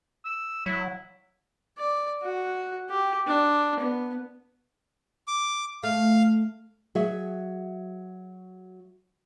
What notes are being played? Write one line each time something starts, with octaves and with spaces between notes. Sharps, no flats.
E6
F#3 E4
D5
F#4
G4
D4
B3
D6
A3 F5
F#3 F#4 G#4 E5